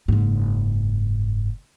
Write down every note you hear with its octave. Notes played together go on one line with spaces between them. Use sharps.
F#1 G#2